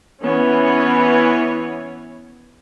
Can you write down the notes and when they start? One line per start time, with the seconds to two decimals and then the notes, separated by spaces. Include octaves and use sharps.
0.23 E3 B3 C#4 C#5